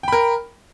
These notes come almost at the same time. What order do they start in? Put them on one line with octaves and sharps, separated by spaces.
G5 B5 A#4